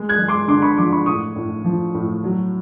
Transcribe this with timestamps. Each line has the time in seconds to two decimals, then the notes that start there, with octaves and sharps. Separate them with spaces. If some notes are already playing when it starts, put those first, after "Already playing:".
Already playing: G#3
0.09 F#6 G#6
0.19 G#3
0.28 C6 D6
0.48 D3 C6 D6
0.62 B5 C#6
0.77 F3 C6 D6
0.92 B5 C#6
1.06 A2 C#6 D#6
1.36 A2
1.64 F3
1.94 A2
2.24 F#3